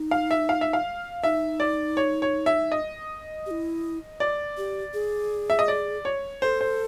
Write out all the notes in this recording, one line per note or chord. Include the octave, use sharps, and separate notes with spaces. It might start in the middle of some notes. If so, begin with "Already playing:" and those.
Already playing: D#4
F5
E5
F5
E5
F5
D#4 E5
D5
C#5
C#5
E5
D#5
G4
E4
D5
G4
G#4
E5
D#5
D5
C#5
A4 C5
C5